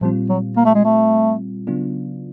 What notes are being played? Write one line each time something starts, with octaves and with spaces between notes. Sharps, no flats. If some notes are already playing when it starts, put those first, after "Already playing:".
A#2 F3 G3 C4 F4
F#3
A#3
A3
G#3
A3
C#3 F#3 B3 D4 F4